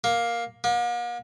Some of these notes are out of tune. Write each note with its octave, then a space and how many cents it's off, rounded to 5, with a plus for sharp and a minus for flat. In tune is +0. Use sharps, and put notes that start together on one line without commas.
A#3 +10
A#3 +45